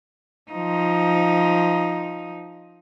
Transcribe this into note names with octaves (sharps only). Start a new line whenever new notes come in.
F3 D#4